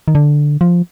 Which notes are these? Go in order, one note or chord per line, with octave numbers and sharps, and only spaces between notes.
D#3
D3
F3